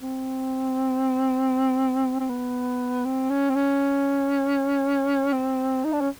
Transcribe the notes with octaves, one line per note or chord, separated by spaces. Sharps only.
C4
C4
B3
C4
C#4
C4
C#4
C4
D#4
D4
C#4